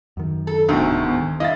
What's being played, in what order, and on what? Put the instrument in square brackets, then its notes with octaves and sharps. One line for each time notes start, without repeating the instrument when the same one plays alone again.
[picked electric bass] F#2 D#3
[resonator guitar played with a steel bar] A4
[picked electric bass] D1 B3 [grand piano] D2 D#3 [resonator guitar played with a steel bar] G#2 C3 F#4
[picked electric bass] B3
D#3
[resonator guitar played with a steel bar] E4 [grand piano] D#5 F5 A6